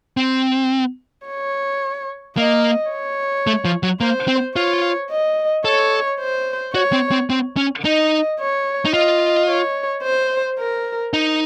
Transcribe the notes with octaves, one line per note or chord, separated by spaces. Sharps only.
C4
C#5
A#3 D#5
C#5
A3
F3
F#3
A#3 C5
C4
F4 C#5
D#5
A4 C#5
C5
F#4 C#5
C4
C4
C4
C#4
D#4 D#5
C#5
D#4
F4 D#5
C#5
C5
A#4
D#4